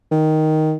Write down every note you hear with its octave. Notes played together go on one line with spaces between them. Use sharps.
D#3